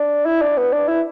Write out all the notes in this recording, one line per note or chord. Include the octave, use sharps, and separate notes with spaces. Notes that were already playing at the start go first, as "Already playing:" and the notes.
Already playing: D4
E4
D4
B3
D4
E4